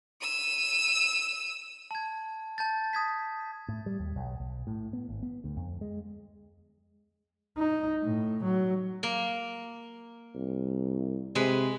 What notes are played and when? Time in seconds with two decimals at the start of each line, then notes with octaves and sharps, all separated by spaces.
0.22 E6 D#7
1.91 A5 G#6
2.58 A5 G6 A6
2.93 A5 D#6 G#6 B6
3.68 A2
3.86 G3
3.99 D#2
4.16 B1
4.40 B1
4.67 A2
4.93 B3
5.08 G#1
5.23 B3
5.44 D2
5.57 F2
5.81 G#3
7.58 D#4
8.03 A2
8.44 F#3
9.03 A#3
10.35 C2
11.35 C3 G#3 B4